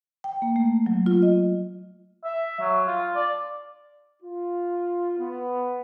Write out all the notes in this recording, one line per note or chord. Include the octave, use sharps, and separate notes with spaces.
G5
A#3
A3
F#3
F4
D#5
E5
F#3
F4
D5
F4
B3